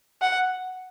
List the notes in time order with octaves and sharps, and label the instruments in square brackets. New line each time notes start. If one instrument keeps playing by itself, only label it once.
[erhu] F#5